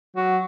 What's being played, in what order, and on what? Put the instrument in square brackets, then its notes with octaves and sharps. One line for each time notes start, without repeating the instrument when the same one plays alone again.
[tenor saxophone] F#3